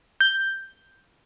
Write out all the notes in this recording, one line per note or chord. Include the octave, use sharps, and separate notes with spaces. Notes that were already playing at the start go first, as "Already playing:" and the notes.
G6